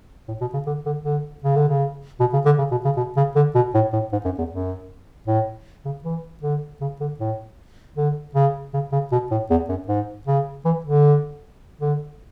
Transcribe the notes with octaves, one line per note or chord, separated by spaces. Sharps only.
A2
B2
C#3
D3
D3
D3
C#3
D3
C#3
B2
C#3
D3
C#3
B2
C#3
B2
C#3
D3
B2
A2
A2
G#2
F#2
E2
F#2
A2
C#3
E3
D3
C#3
D3
A2
D3
C#3
C#3
C#3
B2
A2
E2
F#2
G#2
C#3
E3
D3
D3